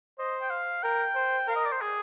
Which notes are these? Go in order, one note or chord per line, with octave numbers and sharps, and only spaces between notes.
C5 D#5
G5
F5
A#4 G5
C5
A#4 F5
D#5
D5
C5
G#4